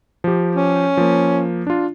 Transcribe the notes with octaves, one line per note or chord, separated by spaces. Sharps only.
F3 G4
C#4
F3 A#3
D4 F4